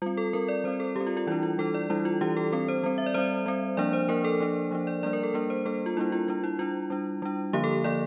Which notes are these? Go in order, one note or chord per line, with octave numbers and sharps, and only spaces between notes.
G3 C4 F4
A4
G3 C4 A#4
D5
G3 C4 C5
A4
G3 C4 G4
F4
F4
E3 G3 D4 E4
F4
E3 G3 D4 A4
D5
E3 G3 D4 E4
F4
E3 G3 D4 G4
A4
G3 C4 A4
C5
G3 C4
E5
D5
G3 C4 C5
G3 C4
F3 A#3 D4 D5
C5
F3 A#3 D4 A#4
A4
F3 A#3 D4
F3 A#3 D4
D5
G3 A#3 D4 D5
A#4
A4
G3 A#3 D4 A#4
C5
G3 A#3 D4 A4
F4
G3 A#3 D4 E4
F4
G3 D4 F4
E4
G3 D4 F4
G3 D4
G3 D4
D3 F3 A#3 G4
A4
D3 F3 A#3 D5